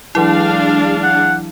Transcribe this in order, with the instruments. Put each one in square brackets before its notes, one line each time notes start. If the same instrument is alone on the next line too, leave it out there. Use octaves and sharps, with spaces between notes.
[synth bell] E3 F#3 E4 [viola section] G#3 D4 F5
[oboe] F#5